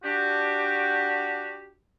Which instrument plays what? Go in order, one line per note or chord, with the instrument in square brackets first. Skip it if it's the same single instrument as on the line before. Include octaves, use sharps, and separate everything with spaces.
[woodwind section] D4 F#4 G4